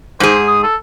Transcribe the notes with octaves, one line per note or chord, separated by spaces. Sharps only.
G#2 G#4 C5
D#6
A4